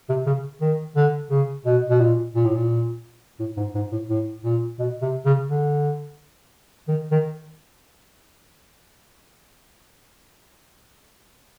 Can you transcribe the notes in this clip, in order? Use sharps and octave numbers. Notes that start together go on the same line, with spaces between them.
C3
C#3
D#3
D3
C#3
B2
B2
A#2
A#2
A2
A#2
A2
G#2
G#2
A2
A2
A#2
B2
C3
C#3
D3
D#3
D#3